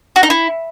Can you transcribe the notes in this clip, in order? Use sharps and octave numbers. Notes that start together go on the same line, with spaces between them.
F#4
D#4
E4